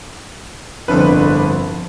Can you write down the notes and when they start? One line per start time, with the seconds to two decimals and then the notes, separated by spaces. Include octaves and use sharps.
0.88 G1 C2 F2 D4 B4